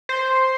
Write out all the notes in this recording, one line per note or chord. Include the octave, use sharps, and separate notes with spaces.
C5